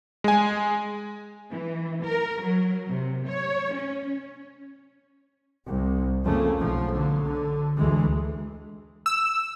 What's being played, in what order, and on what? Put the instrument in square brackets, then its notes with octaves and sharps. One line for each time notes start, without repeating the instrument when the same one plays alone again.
[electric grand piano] G#3 G#5
[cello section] E3
A#4
F#3
C3
C#5
C#4
[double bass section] C2
F2 C#3 A3 A#3
B1 F3
D3 F#3
D3
D2 E3 G#3
[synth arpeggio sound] E6